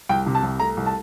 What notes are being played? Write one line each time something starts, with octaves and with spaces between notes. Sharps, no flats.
C2 G5
C3
A5
C2
A3 A#5
C2
A5